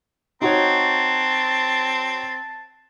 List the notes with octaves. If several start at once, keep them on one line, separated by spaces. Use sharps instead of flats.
C4 D#4 F#4 C#5 A5